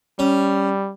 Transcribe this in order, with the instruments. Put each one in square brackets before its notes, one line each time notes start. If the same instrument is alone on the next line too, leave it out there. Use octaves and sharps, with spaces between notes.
[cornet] G3 [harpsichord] C#4